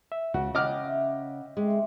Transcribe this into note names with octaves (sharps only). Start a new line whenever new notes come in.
E5
C#2 C#3 F#4
C#4 D#5 F#5 G5 D6 F6
E5
G#3 A3 C4 G4